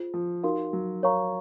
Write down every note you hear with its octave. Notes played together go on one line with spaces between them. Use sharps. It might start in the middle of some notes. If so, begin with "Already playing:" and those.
Already playing: F4 G#4 C5
F3
D#4 F#4 A#4 F5 C6
F#3
A#4 C#5 F5 A#5 C#6